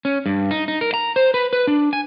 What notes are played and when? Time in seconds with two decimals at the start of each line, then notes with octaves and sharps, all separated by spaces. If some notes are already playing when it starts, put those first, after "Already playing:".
0.05 C#4
0.26 G2
0.51 D#4
0.68 D#4
0.81 A#4
0.94 A#5
1.16 C5
1.34 B4
1.53 B4
1.67 D4
1.93 G#5